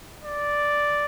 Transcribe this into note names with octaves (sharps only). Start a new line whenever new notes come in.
D5